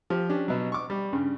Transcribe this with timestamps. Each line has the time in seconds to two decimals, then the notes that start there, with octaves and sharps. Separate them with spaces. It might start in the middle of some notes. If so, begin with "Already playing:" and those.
0.10 F3 G4
0.29 C#4 D4 G4
0.48 B2 F#3
0.72 C#6 D6
0.90 G3
1.13 G2 C#3